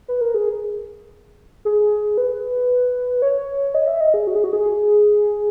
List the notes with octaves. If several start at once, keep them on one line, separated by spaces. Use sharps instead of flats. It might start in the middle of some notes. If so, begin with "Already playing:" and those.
B4
A#4
G#4
G#4
B4
C#5
D#5
E5
D#5
G#4
F#4
G#4
F#4
G#4